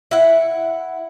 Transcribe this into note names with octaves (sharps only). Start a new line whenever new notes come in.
E4 F#5